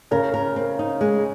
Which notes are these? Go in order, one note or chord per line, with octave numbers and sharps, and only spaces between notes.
C#3 C#4 A#4
A#4
C4
D#4
G#3